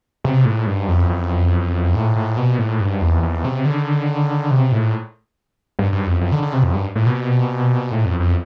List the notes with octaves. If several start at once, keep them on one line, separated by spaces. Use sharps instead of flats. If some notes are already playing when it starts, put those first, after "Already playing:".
C3
A2
G2
F2
F2
A2
A2
B2
A2
G2
E2
E2
C3
D3
C3
A2
G2
G2
F2
F2
D3
D3
C3
F2
G2
A2
B2
A2
F2
F2